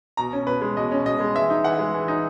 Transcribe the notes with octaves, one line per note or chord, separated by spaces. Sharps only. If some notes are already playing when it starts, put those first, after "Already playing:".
B2 A#5
C#4
B2 B4
G#3
B2 D#5
C#4
B2 D#5
G#3
E3 E5
D#4
E3 F#5
G#3
E3
D#4